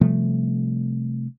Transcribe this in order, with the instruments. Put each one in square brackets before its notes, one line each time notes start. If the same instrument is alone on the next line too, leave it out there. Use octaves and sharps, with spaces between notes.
[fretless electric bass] C3 F3 G3 A3